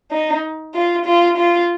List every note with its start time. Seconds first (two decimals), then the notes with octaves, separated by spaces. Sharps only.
0.11 D#4
0.74 F4
1.05 F4
1.37 F4